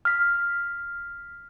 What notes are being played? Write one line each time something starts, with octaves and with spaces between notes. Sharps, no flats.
F6 B6